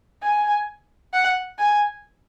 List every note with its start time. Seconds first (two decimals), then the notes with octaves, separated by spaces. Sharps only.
0.22 G#5
1.13 F#5
1.58 G#5